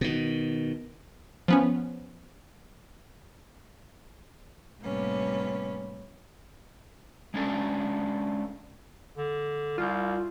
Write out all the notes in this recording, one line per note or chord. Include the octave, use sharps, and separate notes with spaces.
B2 D#3
F3 B3 C#4
A2 C3 G3 A#3 B3 C#4
G#3 C#4 D4 A4
D3
C2 F4